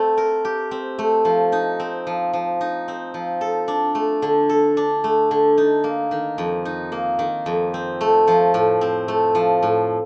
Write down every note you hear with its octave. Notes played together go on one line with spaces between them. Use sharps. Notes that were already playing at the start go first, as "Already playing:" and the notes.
Already playing: A3 C4
A#4
G4
C4
A3
F3
D#4
C4
F3
F3
D#4
C4
F3
A4
D4
A3
D3
A4
D4
A3
D3
D#4
A#3
D#3
F2
D#4
A#3
D#3
F2
C4
A3
F3
A2
C4
A3
F3
A2